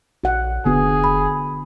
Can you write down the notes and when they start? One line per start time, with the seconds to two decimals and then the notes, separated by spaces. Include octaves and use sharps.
0.24 A#1 F#4 F#5
0.65 F1 D3 B3 F#4 G#4
1.04 B5